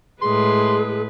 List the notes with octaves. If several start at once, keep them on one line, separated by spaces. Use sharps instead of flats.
A2 G#3 G#4 B4 C6